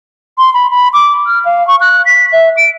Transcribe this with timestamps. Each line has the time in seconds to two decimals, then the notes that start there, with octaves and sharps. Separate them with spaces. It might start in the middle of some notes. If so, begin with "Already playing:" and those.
0.38 C6
0.54 B5
0.71 B5
0.93 D6
1.26 F6
1.45 F5
1.68 C#6
1.81 F#6
2.06 B6
2.33 E5
2.57 D7